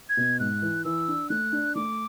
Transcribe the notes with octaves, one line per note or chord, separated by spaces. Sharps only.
G#6
B2
G#2 F#6
E3
E3 E6
D4
A3 F#6
D4
A3 D6